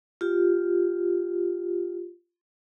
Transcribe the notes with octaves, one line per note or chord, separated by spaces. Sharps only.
F4 G4